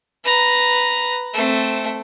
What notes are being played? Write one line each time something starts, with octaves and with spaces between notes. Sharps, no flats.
B4 A#5
A3 C4